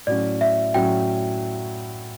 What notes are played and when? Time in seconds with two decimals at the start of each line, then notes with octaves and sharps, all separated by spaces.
0.07 A2 F#3 C#4 D5
0.41 E5
0.74 A2 F#3 C#4 G5